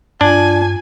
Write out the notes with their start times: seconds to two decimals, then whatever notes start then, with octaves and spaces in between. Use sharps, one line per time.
0.21 G2 D4 F4 G#5 A5